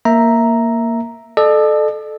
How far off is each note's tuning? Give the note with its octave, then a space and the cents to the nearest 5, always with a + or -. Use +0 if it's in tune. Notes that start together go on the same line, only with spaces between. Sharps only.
A#3 +0 E5 +0 A#5 +0
A4 -15 D5 +45